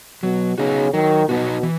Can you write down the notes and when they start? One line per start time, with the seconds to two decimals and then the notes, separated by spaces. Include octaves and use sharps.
0.23 B2 F#3
0.58 C#3 B3 D#4 F#4
0.94 D#3 F#3
1.28 B2 B3 D#4 F#4
1.63 E3